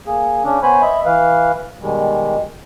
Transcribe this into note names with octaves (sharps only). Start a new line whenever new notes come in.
A#3 G#4
C#3 C#4 D4
B3 C5 C#5 G#5 B5
D#5 E5 B5
E3 B4 F5
B2 D#3 G3 G#3